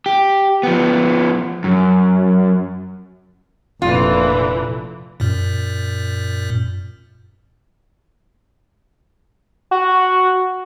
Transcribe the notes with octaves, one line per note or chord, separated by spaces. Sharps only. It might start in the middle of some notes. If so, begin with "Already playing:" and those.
G4
F3 B3
F#2
F1 A#2 D3 E3 F4
F#2 A#2
F#4